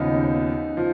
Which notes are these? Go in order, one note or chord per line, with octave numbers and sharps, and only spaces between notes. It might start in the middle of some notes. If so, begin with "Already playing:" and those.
Already playing: D#2 C#3 F3 B3 D#4
F3